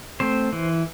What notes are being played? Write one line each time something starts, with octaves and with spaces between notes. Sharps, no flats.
A3 C4 C5
E3